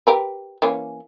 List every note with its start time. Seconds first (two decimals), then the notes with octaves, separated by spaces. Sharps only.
0.07 G4 A#4 B4
0.62 E3 A#3 C#4